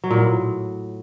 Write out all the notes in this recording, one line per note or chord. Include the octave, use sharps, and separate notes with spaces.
F#3
A#2
A2